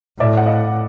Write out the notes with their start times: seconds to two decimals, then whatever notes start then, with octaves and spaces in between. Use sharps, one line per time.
0.19 A2 D5 E5
0.37 F#5
0.46 D#5 F5